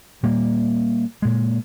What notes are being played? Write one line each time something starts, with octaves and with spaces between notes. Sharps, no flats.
A#2 G3 A#3
A#2 G#3